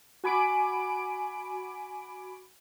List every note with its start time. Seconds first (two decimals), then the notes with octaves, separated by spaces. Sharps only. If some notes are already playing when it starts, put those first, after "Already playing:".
0.24 F#4 G#5 B5 D6 D7